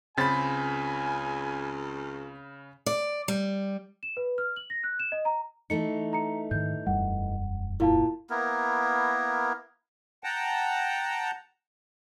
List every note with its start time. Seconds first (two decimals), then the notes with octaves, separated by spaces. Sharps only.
0.17 C#2 C#3 C4 G#5 B5 A6
2.86 D5
3.28 G3
4.03 E7
4.17 B4
4.38 F6
4.56 F#7
4.70 A#6
4.83 F#6
5.00 E7
5.12 D#5
5.25 A#5
5.70 E3 A3 D#4 C#7
6.13 A#5 C#7
6.51 G#2 D#3 G6
6.87 E1 F#2 G3 F#5
7.80 A#2 E4 F5 A5
8.30 A#3 B3 E4 A#4
10.24 F#5 G5 A5 A#5